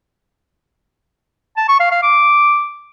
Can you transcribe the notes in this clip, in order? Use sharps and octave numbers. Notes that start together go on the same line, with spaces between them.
A5
C#6
F5
F5
D6